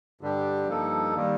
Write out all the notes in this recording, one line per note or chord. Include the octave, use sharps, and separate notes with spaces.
G2 D3 G3 D4 G4
G2 F3 A#3 D#4 A4
D#3 G3 A#3